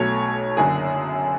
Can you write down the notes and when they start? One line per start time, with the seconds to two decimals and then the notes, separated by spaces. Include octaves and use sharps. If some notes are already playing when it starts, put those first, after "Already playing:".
Already playing: B1 B2 F#3 A3 C#5
0.57 F#1 F#2 D3 G#4